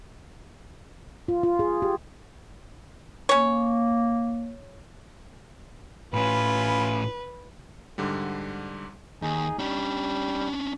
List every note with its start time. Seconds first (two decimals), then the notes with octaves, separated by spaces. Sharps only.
1.28 F4
1.43 F4
1.59 G#4
1.82 G4
3.29 A#3 C#4 C#5
6.14 A2 C#4 F4 B4 G#5 B5
7.98 G#2 D3 G3
9.22 D#2 D#4 G#4
9.59 G3 C#4 D4